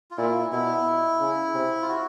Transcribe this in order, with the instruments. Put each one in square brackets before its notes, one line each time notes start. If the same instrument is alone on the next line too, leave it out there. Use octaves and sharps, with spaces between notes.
[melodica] F4
[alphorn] A#2 [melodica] E4
[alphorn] B2 [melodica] E4
[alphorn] C#3
C3
[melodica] F4
F#4